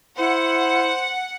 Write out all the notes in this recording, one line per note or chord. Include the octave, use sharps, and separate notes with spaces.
E4 C5 F#5